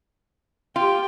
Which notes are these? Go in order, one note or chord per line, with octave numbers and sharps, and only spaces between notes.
F4 G4 G5